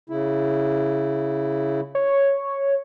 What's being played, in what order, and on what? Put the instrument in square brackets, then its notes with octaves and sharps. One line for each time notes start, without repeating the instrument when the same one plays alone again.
[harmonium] C#3 E4
[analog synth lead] C#5